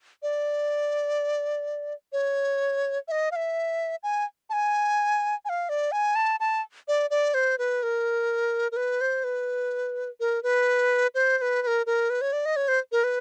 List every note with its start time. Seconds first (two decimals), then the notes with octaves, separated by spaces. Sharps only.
0.23 D5
2.13 C#5
3.08 E5
3.12 D#5
3.32 F5
3.36 E5
4.03 G#5
4.50 A5
4.53 G#5
5.45 G#5
5.49 F5
5.69 D5
5.92 G#5
6.16 A5
6.40 A5
6.88 D5
7.10 D5
7.34 C5
7.58 B4
7.83 A#4
8.72 A#4
8.77 B4
9.01 C5
9.24 B4
10.20 A#4
10.43 B4
11.15 C5
11.38 C5
11.42 B4
11.62 B4
11.67 A#4
11.86 A#4
12.10 B4
12.21 C#5
12.33 D5
12.46 D#5
12.56 C#5
12.68 C5
12.92 A#4
13.04 B4